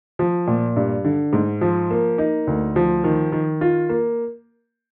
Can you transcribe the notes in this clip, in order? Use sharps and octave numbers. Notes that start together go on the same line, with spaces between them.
F3
A#2
G2
D3
G#2
F3
A#3
D#4
D2
F3
D#3
D#3
F4
A#3